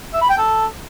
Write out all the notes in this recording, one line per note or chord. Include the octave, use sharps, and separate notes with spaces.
E5
B5
G5
A4